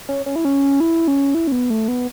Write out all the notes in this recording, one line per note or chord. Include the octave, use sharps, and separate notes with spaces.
C#4
C#4
E4
C#4
E4
C#4
E4
C#4
B3
A3
B3